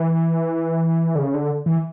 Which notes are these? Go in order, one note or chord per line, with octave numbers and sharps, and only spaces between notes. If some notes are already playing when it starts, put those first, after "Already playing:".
Already playing: E3
D3
C#3
D3
E3